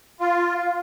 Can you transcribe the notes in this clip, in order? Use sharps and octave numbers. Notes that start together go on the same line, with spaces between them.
F4